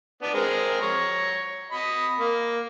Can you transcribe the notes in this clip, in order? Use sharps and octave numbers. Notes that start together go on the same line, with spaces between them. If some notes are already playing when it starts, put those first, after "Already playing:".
B3 D4
G#3 C4 A#4
C#5 A#5 C#6
D#5 B5
A#3